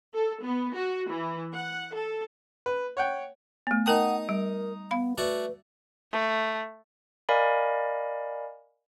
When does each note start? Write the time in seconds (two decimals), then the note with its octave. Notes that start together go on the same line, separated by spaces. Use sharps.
0.14 A4
0.43 B3
0.75 F#4
1.08 E3
1.53 F#5
1.93 A4
2.66 B4
2.97 C#5 F#5 G5
3.67 A3 B3
3.86 D#4 A#4 F#5 G5 A5 D#6
4.29 G3 A#4
4.91 B3 F5 B5
5.18 A3 F#4 B4 D5
6.12 A3
7.29 A#4 D5 D#5 F5 G#5 B5